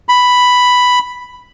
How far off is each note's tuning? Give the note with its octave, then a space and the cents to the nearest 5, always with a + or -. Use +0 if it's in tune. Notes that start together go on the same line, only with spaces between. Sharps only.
B5 +5